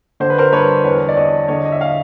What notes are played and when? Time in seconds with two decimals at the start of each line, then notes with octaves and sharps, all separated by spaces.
0.20 D3 C5
0.30 B4
0.38 A#4 C5
0.52 G2 B4 C#5
0.84 E2 B4 C#5
1.08 D5
1.16 E2 C#5 D#5
1.48 D3 C#5 D#5
1.65 D#5
1.72 E5
1.80 D#5 F5